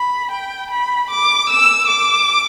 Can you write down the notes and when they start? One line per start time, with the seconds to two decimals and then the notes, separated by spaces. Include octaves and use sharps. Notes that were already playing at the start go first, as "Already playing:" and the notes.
Already playing: B5
0.32 G5
0.71 B5
1.10 D6
1.49 E6
1.88 D6